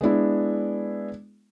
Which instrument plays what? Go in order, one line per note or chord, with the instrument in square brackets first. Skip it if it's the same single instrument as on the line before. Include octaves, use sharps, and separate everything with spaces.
[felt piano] G#3 B3 D4 E4